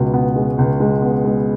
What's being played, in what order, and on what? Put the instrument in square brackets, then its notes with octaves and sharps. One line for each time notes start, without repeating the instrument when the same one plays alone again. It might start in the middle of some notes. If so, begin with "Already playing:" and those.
Already playing: [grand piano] C#2 B2 B3
B3
G#3
C#2
G#3
B3
G#3